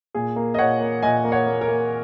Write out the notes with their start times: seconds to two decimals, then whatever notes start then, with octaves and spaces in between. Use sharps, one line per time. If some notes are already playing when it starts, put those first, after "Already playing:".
0.15 A#2 G#4
0.36 A#3
0.54 D#5
0.58 A#2 C#5 F#5
0.80 A#3
1.03 A#2 D#5 G#5
1.24 A#3
1.32 C#5 F#5
1.46 A#3
1.61 A#4
1.68 A#3